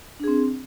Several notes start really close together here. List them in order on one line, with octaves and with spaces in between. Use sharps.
D4 G#4 C4